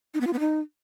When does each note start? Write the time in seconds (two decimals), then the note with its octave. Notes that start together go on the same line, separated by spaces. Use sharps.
0.14 D#4
0.21 B3
0.27 F4
0.33 B3
0.40 D#4